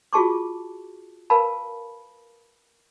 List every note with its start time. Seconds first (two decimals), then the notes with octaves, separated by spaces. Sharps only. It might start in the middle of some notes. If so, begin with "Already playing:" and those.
0.13 F4 F#4 G#4 A5 C#6 D6
1.30 A#4 B4 F5 A5 B5